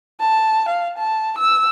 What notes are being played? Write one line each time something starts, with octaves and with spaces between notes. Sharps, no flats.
A5
F5
A5
E6